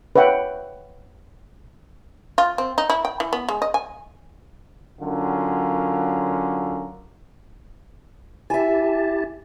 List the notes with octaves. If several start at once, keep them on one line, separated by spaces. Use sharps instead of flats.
B4 C#5 E5 F#5 G5
F4
C4
D#4
E4
G5
E3
B3
G#3
D#5
G#5
D3 F#3 C#4 F4 A#4
E4 G4 E5 G#5 A5